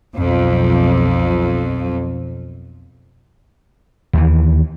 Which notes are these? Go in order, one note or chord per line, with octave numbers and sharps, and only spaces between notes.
B1 F2
D#2 E3